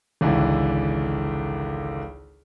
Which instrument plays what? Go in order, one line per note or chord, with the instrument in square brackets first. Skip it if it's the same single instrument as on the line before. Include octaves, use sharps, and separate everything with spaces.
[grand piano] G#1 C#2 D3 E3